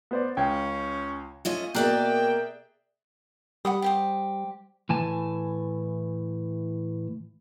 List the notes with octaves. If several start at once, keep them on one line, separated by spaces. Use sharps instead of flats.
B3 C5 D5
C#2 C#4 G5 G#6
A3 C#4 F4 D#5
B2 A#3 G#4 A#4 D5 E5 G5 F#6
G3 F#5 B5 D#6
G4 C5 D#6
A2 E3 G#5 A5